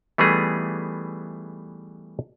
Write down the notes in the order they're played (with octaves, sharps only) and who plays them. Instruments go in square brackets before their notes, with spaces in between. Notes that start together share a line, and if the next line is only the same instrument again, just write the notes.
[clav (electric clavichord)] E3 G3 A3 B3 D#4 G#4